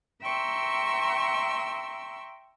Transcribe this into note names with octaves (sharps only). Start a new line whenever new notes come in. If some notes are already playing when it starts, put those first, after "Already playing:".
E5 G5 A#5 C6 C#6 E6